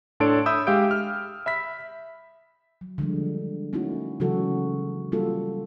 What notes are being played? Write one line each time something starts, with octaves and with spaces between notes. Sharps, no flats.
A2 D4 A4 C#5 C6 D7
E5 B5 D#6 E6 G6
G#3 G4 F5 E6 G6 D7
F6
E5 B5 B6
F#3
D3 F3 G3 G#3
A3 A#3 C#4 D#4 E4 F#4
C#3 E3 F#3 G#3 F#4 A4
G3 A#3 F4 F#4 A4